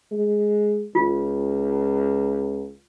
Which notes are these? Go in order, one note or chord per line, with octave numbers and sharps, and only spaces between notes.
G#3
C#2 F4